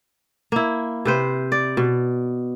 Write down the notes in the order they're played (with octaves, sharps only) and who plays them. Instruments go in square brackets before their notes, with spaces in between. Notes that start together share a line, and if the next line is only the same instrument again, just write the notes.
[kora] A#3 E4
C3 B4 C5
D5
B2